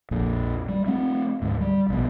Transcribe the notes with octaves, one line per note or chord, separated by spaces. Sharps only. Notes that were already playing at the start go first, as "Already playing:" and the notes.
A#1 F2 A#2
G3
A3 C4
D2 G#2
G3
A#1 B2